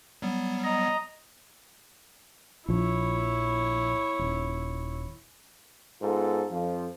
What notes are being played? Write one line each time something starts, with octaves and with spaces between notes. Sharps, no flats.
F#3 G3 B3
D#5 A#5
A#1 F3 E4 C#5
D#1
G#2 B3 F4 A4
F2 F3